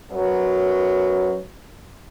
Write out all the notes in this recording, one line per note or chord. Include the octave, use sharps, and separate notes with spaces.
F#2 F#3 B4